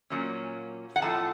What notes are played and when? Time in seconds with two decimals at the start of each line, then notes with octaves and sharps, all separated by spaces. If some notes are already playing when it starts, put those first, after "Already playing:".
0.10 A#2 F#3 A#3 C#4
0.96 F#5
1.02 A2 F3 A3 C4 A5